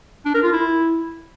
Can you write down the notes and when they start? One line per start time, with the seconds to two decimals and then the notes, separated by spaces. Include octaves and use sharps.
0.25 D4
0.34 A#4
0.43 F4
0.52 E4